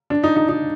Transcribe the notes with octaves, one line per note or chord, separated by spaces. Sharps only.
D4
D#4
D#4
D#4